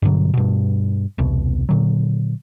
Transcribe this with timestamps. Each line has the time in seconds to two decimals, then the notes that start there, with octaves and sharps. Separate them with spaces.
0.02 G2 B2 D3 F#3
0.34 G2 B2
1.18 E1 C2 B2
1.69 A#2 D3 F#3